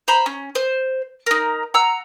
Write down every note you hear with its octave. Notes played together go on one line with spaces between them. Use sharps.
C5 A#5 B5
C#4
C5
D#4 A#4
F#5 A#5 E6